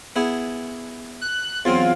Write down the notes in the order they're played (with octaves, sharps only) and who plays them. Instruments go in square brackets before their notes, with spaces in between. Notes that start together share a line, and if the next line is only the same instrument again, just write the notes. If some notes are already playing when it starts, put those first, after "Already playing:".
[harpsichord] B3 E4 G#4
[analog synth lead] F#6
[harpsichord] E2 F#3 C4 [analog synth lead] F4